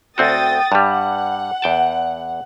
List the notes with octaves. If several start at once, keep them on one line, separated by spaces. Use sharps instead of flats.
D2 C4 F#4 G5 D#6 A6
G2 G3 F#5
E2 G5 A5